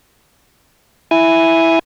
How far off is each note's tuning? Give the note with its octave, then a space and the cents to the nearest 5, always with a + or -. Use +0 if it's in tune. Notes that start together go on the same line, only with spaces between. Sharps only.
E4 +0 G#5 +0